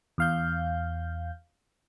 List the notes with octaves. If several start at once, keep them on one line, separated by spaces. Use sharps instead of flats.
E2 F5 G6